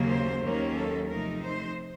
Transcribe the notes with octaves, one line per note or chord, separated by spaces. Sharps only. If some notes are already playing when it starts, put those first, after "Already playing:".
Already playing: D#2 C#3 F#3 A#3
C5
D#2 D#3 F#3 A#3 C#4
A4
C3 F3 A3 D#4 A#4
C5